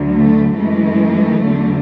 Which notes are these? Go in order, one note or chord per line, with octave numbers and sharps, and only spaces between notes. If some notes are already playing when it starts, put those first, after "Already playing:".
Already playing: D2 D3 F#3
A3
F#2 E3 G#3 A3
E2 D3 F#3